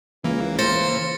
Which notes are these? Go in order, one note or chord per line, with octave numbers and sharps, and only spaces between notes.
C#2 E3 A#3
C5 A6 A#6 C#7